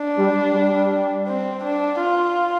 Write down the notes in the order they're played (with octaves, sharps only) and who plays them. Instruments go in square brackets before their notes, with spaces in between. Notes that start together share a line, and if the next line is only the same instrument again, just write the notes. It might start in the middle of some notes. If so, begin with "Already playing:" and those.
Already playing: [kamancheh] D4
[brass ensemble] G3
G3
[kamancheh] C4
D4
F4